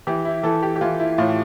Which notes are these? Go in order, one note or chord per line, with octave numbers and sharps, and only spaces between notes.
E3 G4
E4
E3 A4
G4
G4
E3 F4
E4
A2 F4